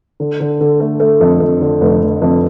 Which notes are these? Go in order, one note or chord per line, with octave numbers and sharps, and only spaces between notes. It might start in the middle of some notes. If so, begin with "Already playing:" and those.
D3
D3
D3
A3
A3
F2
F2
D3
F1
F1
F2